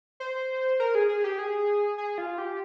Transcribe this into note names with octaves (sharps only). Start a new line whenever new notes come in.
C5
A#4
G#4
G#4
G4
G#4
G#4
F4
G4